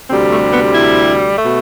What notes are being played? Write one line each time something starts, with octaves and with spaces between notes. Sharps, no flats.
D2 C3 G3 C4
A3
B3
E4
B2 A3